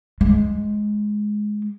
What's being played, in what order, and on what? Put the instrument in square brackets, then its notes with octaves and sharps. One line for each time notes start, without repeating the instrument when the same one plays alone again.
[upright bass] G#3